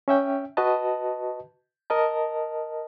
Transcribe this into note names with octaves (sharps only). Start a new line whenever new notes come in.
C#4 E5 G5
F#4 B4 D#5 A5
A#4 D#5 A5